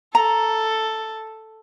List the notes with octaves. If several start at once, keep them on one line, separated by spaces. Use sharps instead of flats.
A4 A#5